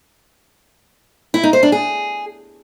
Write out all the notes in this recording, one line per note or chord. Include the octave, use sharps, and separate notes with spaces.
E4
D#4
C5
D4
G#4